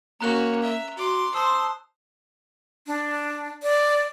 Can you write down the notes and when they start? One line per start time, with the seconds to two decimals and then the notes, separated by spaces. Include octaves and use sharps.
0.21 A#3 C#4 F#4 A#5 F#6 F7
0.62 E5
0.97 F#4 C6 D6
1.34 C5 A5 C6 D#6 E6
2.87 D4
3.63 D5